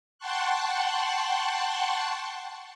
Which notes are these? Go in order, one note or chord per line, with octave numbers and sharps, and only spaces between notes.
F#5 G5 A5 C6 C#6 F#6